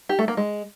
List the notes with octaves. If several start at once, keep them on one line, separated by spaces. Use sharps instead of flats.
G4
A3
A#3
G#3